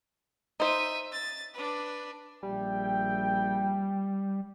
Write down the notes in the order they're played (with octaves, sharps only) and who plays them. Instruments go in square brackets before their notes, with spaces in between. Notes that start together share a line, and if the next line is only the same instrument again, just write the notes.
[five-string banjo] D#4 C5 [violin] E5 D#7
[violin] A6
D4 B4
[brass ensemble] A#1 E5 G5 [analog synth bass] G3